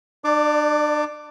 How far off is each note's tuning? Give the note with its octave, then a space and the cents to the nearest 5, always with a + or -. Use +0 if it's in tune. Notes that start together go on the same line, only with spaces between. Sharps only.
D4 +35 D5 +0 D6 +0